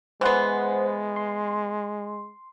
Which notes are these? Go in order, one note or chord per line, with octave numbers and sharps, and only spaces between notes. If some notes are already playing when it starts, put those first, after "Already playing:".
E3 G#3 B3 C5 F#5 C6
C6